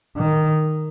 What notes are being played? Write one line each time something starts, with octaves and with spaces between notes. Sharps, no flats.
D#3